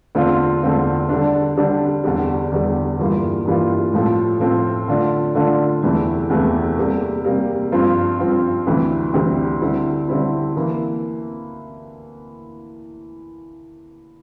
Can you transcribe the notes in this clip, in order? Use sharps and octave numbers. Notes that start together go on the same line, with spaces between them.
E2 D3 A3 C4 F4
E2 D3 A3 C4 F4
D3 G3 D4
D3 G3 D4
E2 D3 G3
E2 D3 G3
G2 E3 G3 A#3 F4
G2 E3 G3 A#3 F4
A2 F3 A3 C4 F4
A2 F3 A3 C4 F4
D3 A3 D4 F4
D3 A3 D4 F4
E2 C3 E3 A3
E2 C3 E3 A3
C3 G3 A#3
C3 G3 A#3
G2 F3 C4 F4
G2 F3 C4 F4
D2 C3 E3 G3 C4
D2 C3 E3 G3 C4
D3 G3 C4 E4
D3 G3 C4 E4
E3 A#3